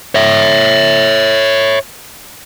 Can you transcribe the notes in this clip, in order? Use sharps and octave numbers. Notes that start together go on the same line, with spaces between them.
C#5 E5